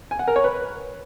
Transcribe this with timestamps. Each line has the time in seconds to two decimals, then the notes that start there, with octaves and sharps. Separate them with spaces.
0.11 G#5
0.19 F#5
0.28 A#4
0.36 C#5
0.44 B4